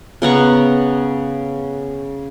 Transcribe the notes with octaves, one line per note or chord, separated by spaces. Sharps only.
C#3 B3 A#5 C#6